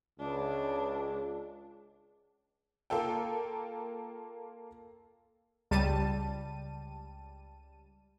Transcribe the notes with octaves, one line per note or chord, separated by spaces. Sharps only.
C#2 D4
A#3 F4 A4 G5
C#2 G3 A5 D#7